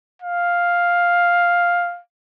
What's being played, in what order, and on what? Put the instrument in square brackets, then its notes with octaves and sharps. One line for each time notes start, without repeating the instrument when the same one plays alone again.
[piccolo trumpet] F5